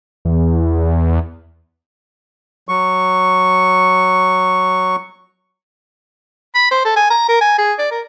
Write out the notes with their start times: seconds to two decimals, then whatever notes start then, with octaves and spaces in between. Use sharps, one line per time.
0.25 E2
2.69 F#3 C#6
6.55 B5
6.71 C5
6.85 A4
6.96 G#5
7.10 A#5
7.28 A#4
7.41 G#5
7.58 G#4
7.79 D5
7.91 A#4